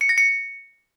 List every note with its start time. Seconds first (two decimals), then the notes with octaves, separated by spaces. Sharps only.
0.01 C#7
0.09 A#6
0.18 C#7